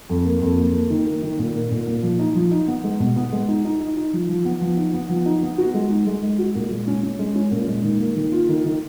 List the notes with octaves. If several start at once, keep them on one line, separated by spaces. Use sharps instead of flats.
F2
A#3
F2
A#3
A#3
D#3
A#3
D#3
A#2
A#3
A#2
A#2
F3
D#4
F3
D#4
B3
G#3
B2
B3
G#3
D#4
D#4
D#4
D#4
F3
F3
B3
F3
D#4
B3
F3
D#4
B3
F#4
G#3
D#4
G#3
G#3
F#4
A#2
G#3
C#4
C#4
G#3
C#4
A#2
G#3
D#3
A#3
D#3
F4
D#3
D#3